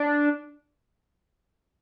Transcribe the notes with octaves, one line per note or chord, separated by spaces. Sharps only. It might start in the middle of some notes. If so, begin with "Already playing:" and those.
Already playing: D4